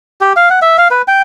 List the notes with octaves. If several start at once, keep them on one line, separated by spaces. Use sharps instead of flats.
G4
F5
F#5
E5
F5
B4
G5